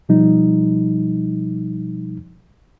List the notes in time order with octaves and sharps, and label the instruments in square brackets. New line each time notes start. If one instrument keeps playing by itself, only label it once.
[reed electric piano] B2 F3 G3 D#4